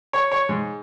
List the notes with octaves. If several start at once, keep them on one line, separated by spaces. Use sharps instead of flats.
C#5
C#5
G#2